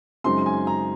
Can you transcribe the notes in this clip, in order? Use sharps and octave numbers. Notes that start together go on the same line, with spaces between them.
F#2 C#3 G#3 C4 D#4 C6
G#5
A#5